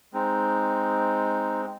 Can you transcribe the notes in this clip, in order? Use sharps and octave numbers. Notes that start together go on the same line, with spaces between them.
G#3 C4 D#4